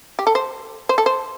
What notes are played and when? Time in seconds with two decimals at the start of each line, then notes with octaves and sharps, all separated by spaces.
0.19 G4
0.27 A4
0.35 C5
0.89 C5
0.98 A4
1.06 C5